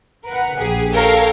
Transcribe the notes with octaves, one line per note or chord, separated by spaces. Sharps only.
A#4 B4 F#5
A#1 G4 G#4
A4 A#4 C#5 F5 G5